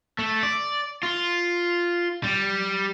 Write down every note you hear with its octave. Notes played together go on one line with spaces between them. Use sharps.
A3
D5
F4
G3